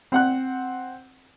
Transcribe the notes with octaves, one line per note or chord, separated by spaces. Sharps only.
C4 F#5 F#6